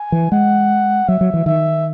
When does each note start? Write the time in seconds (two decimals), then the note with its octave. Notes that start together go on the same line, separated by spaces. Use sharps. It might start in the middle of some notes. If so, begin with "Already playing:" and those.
Already playing: G#5
0.12 E3
0.32 G#3 F#5
1.08 F#3 E5
1.21 F#3
1.34 E3
1.46 D#3 E5